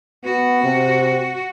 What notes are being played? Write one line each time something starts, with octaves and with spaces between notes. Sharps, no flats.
B3 F#4
C3